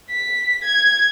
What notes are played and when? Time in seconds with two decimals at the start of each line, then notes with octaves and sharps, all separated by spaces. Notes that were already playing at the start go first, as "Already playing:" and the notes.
0.10 B6
0.64 G#6